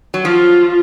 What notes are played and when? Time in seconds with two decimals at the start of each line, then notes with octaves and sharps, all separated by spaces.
0.14 F#3
0.25 F3 F4